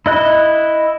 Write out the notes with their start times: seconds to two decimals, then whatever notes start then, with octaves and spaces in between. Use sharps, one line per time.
0.06 E4 D#5 F#6